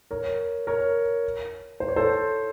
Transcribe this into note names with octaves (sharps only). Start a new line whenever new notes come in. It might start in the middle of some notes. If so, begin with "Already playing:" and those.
A#4 C#5
A#4 C#5
C5
C#5
A4 C5